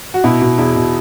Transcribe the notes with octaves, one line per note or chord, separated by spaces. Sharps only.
F#4
B2 E4
B2
E2 E4
B2